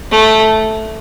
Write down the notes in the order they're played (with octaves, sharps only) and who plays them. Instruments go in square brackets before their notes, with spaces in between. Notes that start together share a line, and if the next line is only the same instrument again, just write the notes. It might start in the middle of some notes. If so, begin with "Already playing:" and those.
[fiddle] A3